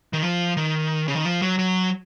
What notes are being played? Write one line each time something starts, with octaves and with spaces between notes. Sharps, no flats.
D#3
F3
D#3
C#3
D#3
F3
F#3
F#3